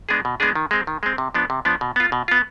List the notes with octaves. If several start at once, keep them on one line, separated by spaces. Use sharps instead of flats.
G#3 B3 D4 G#4
B2
G#3 B3 D4 G#4
D#3
G#3 C4
D#3
G#3 C4
C3
F3 B3 D4
C3
F3 B3 D4
B2
B3 F4
B2
B3 F4